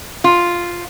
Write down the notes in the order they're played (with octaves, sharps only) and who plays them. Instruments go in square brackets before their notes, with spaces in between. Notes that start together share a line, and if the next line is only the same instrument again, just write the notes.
[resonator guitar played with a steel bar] F4